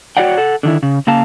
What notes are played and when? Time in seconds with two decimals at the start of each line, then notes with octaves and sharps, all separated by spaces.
0.17 F#4 C#5 D5 F#5 G5
0.38 A4 F#5
0.63 D3 D#3 E4
0.83 C#3
1.07 C#3 A#3 F5 A5